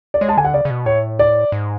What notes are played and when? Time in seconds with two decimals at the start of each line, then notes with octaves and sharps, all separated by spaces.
0.14 D5
0.21 G#3 C#5
0.29 A5
0.37 D3 G#5
0.45 F#5
0.54 C#3 D5
0.65 C#3
0.70 B2
0.86 A2 C#5
1.19 D5
1.52 G#2